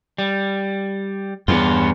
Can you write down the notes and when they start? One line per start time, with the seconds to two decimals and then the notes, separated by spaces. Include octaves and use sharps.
0.18 G3
1.48 E2 G2 B3 F4